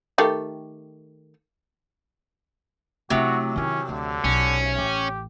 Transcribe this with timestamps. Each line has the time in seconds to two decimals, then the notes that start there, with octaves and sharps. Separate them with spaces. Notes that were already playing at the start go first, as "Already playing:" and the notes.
0.18 D#3 A3 G4
3.10 C3 F#3 A3 E4 F#4
3.56 D#3 C#4 E4
3.89 D2 D3
4.24 B1 C#4
4.78 A1 G4